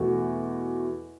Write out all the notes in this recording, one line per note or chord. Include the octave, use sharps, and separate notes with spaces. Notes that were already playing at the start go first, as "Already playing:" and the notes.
Already playing: E2 B2 A3 F#4